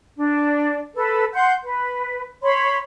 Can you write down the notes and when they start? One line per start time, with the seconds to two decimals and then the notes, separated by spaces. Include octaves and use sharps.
0.17 D4
0.96 A4 B4
1.33 F#5 C6 G6
1.63 B4
2.43 C#5 B5 C6